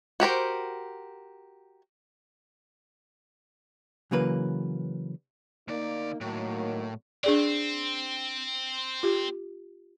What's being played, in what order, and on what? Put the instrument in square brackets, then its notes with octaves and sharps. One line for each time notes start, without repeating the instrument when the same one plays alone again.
[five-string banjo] F#4 G4 A#4 C5
[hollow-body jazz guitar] C#3 E3 F#3 A#3 B4
[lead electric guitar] D2 D5 [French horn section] A#3 D#4
[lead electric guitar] A2 [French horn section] D#3 F#3 A#3
[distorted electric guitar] C4 [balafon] D4 G#4 D5
[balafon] F4 G4